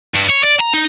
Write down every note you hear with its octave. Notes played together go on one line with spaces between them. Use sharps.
G2
C#5
D5
A#5
D#4